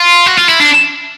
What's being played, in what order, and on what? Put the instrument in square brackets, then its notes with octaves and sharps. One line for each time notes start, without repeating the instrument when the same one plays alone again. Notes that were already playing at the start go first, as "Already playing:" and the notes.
Already playing: [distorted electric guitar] F4
F#4
F4
E4
D4